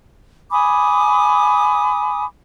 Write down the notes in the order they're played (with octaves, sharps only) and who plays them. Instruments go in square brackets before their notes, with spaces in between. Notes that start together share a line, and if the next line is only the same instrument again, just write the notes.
[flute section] G#5 B5 D6 D#6